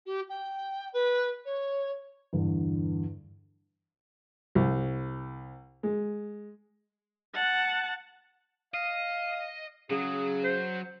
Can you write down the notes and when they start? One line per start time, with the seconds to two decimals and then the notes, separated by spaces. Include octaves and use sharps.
0.06 G4
0.29 G5
0.93 B4
1.45 C#5
2.33 E2 G2 D3
4.55 C2
5.83 G#3
7.34 F#5 A5
8.74 D#5 F5
9.91 C#3 F#3 G#4
10.44 C5